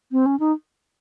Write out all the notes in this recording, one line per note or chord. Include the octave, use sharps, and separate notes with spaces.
C4
C#4
D#4